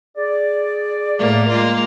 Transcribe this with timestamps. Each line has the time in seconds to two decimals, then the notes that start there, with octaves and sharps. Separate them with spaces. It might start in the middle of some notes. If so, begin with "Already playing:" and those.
0.17 G#4 D5
1.18 A2 A#3
1.49 G#3 A#3 F4